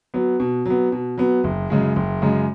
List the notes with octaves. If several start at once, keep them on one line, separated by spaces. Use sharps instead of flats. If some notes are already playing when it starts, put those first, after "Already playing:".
F#3 B3
B2
F#3 B3
B2
F#3 B3
F#1
F#2 C#3 G#3
F#1
F#2 C#3 G#3